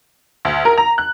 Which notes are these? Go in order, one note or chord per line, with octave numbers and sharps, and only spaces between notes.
D2
A#4
A#5
F#6